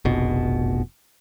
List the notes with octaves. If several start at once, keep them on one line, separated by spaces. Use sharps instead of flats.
F1 A#1 B2